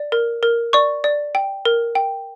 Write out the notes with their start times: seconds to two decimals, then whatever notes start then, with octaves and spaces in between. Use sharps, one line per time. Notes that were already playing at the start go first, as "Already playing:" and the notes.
Already playing: D5
0.12 A#4
0.43 A#4
0.73 D5 C#6
1.04 D5
1.35 G5
1.65 A#4
1.95 G5